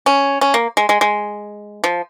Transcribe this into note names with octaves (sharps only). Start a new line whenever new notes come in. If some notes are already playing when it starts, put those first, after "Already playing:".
C#4
C#4
A#3
G#3
G#3
G#3
F3